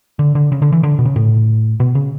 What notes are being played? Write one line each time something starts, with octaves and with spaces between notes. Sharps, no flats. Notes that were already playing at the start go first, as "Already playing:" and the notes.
D3
D3
C#3
D3
E3
D3
B2
C#3
A2
B2
C#3